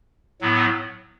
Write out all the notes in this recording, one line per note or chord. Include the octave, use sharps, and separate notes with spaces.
A2 F#3 B3